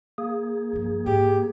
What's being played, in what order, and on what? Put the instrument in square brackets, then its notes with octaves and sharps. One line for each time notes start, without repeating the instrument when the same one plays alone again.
[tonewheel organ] A#3 G#4
[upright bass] G2 F3
[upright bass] G#2 [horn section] G4